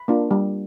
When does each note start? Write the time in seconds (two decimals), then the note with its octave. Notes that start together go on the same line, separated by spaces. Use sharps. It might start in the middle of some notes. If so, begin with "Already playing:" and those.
Already playing: B5
0.08 A#3 D4 F4
0.31 G3